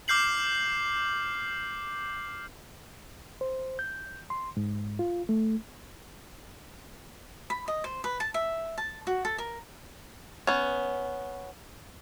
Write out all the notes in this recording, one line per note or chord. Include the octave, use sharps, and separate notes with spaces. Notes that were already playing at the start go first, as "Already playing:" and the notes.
D6 F6 G6 C7 F#7
C5
G6
C6
G#2
F4
A3
B5
D#5
C5
B4
A5
E5
A5
F#4
A4
A#4
B3 C#4